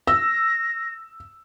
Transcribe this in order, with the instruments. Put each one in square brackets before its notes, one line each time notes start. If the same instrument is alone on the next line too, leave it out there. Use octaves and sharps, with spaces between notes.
[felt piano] E6 [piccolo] A#6